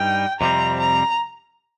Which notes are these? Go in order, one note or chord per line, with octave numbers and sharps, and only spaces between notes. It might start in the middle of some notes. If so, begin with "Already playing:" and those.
Already playing: G2 G3 D#4 G5
F2 C3 G3 C4 A#5
A#5